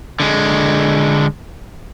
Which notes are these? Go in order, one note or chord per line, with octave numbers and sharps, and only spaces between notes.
D3 G#3